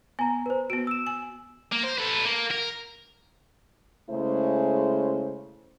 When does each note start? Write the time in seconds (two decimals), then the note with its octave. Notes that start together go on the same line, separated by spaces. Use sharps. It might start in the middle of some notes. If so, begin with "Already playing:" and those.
0.19 B3 G#5 A#5
0.46 B4 C5
0.70 B3 F#4 D7
0.87 E6 E7
1.07 G#5
1.72 A#3
1.84 C5
1.98 A4 B4
2.25 A#3
2.51 A#4
4.10 C#3 G#3 A3 C#4 E4 C5